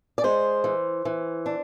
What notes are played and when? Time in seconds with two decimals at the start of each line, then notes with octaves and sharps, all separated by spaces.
0.18 D5
0.24 G#3 C5
0.64 E3
1.05 E3
1.46 D4